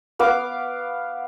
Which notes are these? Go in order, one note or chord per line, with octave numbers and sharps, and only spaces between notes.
B3 F5 D6